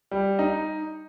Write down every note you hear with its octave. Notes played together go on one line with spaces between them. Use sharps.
G3
D#4